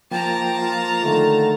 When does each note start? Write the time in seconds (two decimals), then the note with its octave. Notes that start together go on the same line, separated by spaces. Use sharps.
0.11 F3 A#3 G5 A5 A#5
0.60 F4
1.00 D3 D#3 A3